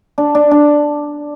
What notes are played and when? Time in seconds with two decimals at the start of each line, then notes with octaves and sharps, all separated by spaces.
0.18 D4
0.35 D4
0.51 D4